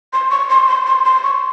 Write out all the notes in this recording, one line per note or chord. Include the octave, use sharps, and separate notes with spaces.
C6
C#6
C6
C6
C6
C6
C#6